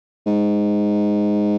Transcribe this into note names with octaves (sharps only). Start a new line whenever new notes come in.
G#2